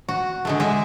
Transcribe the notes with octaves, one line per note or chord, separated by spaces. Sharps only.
F#4
D3 G#3 A3
G#3 E5